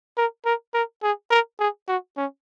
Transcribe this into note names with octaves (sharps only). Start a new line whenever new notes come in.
A#4
A#4
A#4
G#4
A#4
G#4
F#4
C#4